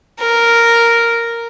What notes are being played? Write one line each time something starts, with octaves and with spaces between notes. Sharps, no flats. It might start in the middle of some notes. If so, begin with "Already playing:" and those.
A#4